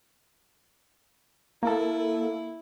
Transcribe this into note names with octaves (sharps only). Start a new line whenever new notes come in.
A#3 E4 A4